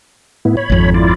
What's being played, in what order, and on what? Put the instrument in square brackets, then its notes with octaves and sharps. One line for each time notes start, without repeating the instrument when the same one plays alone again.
[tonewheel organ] A2 B3 E4
C#5 B5
[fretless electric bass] G#1 F2
[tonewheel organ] E4 F4 D5